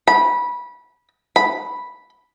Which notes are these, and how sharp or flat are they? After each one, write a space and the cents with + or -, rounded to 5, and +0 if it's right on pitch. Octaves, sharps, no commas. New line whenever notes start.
B5 -20
B5 -5